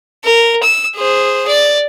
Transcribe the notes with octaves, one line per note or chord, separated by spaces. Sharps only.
A#4
E6
G#4 C5
D5